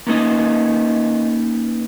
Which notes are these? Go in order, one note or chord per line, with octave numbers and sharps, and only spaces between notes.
A#3 B3 C#4 D#4 D#5